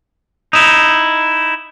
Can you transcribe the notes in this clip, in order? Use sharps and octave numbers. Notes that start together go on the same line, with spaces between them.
D#4 E4